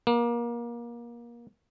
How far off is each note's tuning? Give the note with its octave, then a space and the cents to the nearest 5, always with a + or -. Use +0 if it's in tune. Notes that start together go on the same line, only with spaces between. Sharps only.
A#3 +30